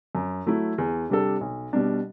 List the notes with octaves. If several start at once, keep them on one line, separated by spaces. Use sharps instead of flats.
F#2
F#3 A3 E4
E2
C3 G3 D4 A4
B1
B2 G3 D4